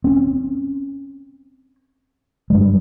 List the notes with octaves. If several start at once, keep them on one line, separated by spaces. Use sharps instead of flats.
C4 C#4
G2 F#3 G#3